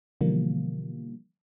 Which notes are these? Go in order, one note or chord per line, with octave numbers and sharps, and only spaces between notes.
B2 D3 E3 F3 G3 A#3